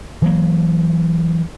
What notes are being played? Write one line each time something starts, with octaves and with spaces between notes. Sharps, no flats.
E3 F#3 A#3